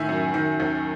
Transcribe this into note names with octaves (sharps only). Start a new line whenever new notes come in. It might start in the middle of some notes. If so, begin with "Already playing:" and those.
Already playing: A2 D#3 E5 G#5
F#2
D#3
D#2